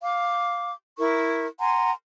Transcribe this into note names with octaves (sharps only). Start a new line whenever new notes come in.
F5 D6
E4 A#4 C#6
F#5 G#5 A#5 C6